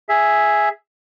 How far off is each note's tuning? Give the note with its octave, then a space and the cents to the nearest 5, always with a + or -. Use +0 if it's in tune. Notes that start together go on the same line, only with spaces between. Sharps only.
G#4 +0 E5 +0